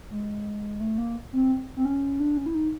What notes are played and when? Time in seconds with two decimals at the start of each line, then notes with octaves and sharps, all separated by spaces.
0.10 G#3
0.80 A3
0.98 A#3
1.33 C4
1.76 C4
1.85 C#4
2.20 D4
2.37 C#4
2.46 E4
2.55 D#4